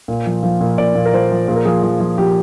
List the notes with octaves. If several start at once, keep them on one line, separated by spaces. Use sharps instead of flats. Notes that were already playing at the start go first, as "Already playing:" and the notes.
A#2
F3
F3
A#2
A#2 D5
A#2
A#4
F3 C5
F3
A#2 G#4
A#4
F3 G#4
F3
F3
F3 G4